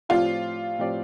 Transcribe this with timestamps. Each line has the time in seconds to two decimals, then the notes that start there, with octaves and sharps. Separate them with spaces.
0.09 A2 F3 C4 F4 G4 D5
0.78 A2 F3 C4 G4 D5